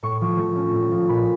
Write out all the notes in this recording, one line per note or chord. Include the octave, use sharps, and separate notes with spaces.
A2 C#6
F3
A3
C#4
A2
F3
A#2 B5